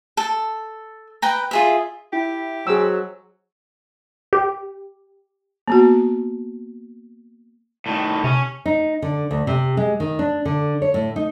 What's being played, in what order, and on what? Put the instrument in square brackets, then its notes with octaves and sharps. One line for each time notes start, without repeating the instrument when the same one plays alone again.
[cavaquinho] A4
B4 G5 A#5
F4 G#4 E5
[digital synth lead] E4 [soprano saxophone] G4
[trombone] F#3 [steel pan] G#4 E6 [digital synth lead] C5
[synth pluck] G4
[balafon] A#3 B3 F#4
[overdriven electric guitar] A2 D#3
[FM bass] C3 [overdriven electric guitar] C#4
[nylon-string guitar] D#4
D3
D2
C3
G#3
D#3
D4
D3
C#5
A2
D#4